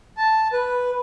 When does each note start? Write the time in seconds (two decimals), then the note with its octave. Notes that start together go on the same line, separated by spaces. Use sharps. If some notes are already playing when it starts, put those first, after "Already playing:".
0.17 A5
0.52 B4